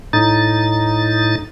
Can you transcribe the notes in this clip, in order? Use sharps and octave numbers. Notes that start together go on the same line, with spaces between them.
A2 D#4 A6